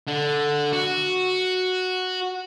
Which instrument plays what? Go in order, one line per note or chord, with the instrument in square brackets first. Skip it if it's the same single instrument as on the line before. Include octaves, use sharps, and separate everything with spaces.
[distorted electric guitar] D3
F#4